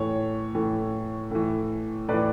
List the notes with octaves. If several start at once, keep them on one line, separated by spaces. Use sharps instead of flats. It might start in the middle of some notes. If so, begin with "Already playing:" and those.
Already playing: A2 E3 C#5
A2 E3
A2 E3
A2 E3 B4 D5